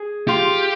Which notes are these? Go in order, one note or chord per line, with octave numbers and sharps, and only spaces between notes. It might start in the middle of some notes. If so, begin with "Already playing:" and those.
Already playing: G#4
F4 G4